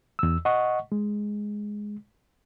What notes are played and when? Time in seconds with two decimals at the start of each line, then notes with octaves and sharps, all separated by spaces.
0.19 E2 E6
0.45 D#5 F#5 C#6
0.92 G#3